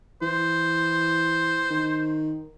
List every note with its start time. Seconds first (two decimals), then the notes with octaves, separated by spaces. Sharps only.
0.22 E3 C5
1.70 D#3